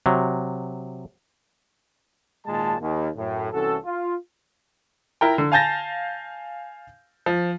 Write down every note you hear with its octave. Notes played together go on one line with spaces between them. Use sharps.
C3 F#3
G#1 A#2 D#3 G#3 A#3 A5
D#2
F#2 A2
C2 C3 E3 C#4 F#4 A4
F4
E4 A#4 G5
D3
F5 G#5 A5 G6 A6 A#6
F3